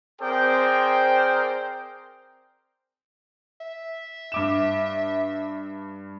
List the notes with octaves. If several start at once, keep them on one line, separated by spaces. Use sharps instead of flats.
C4 G#4 A#4 C5 D5 G5
E5
G2 D6 E7